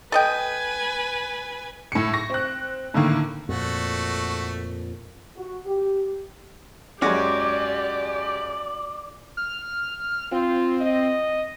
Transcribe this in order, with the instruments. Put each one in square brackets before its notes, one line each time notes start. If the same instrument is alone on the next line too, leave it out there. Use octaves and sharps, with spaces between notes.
[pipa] A4 D#5 G5 [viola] B4 G#5
[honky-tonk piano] A2 C#7
C#6 A#6
C4 F#6
A2 D3 D#3 A#3
[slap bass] F2 A#2 [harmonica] A3 F#4
[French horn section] F#4
G4
[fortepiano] F#2 G#3 C#4 [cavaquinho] F#4 D6 [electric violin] G4 [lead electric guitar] D5
[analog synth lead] F6
[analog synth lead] C4 [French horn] F4
[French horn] D#5